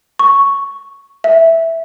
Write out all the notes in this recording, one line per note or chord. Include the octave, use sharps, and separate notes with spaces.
C#6
E5